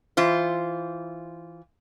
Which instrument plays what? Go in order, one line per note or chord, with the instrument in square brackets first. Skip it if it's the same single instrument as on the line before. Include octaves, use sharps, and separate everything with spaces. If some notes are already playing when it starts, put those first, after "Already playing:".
[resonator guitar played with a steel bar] E3 F4 C5